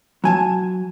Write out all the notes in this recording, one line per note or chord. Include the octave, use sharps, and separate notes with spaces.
F#3 G#5 A5